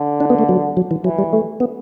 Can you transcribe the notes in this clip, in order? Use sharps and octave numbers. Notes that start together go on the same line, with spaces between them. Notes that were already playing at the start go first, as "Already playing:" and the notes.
Already playing: D3
D4
B3
A3
F#3
F#3
E3
E3 F#3
G3
A3
B3